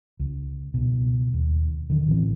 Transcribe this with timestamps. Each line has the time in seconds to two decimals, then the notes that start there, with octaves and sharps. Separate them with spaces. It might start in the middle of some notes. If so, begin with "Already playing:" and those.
0.20 C#2
0.74 C#2 B2
1.34 D#2
1.90 D3 D#3
2.06 A1 E3 C4